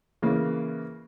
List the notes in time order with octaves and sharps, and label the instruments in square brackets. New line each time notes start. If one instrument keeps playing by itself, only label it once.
[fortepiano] C#3 E3 A#3